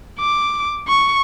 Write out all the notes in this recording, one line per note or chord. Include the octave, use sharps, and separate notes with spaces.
D6
C#6